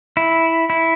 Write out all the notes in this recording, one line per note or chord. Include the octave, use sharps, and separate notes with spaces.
E4
E4